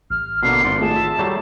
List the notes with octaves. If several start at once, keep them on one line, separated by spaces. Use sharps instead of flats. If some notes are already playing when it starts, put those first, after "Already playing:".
A1 F6
B2 D3 A#3 C7
G#1 D5 F#5 C6
A3 F4 G#4 A5
E5
F#3 G3 A3